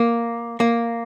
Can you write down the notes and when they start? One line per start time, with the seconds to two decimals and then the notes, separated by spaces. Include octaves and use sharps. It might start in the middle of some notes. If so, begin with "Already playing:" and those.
Already playing: A#3
0.60 A#3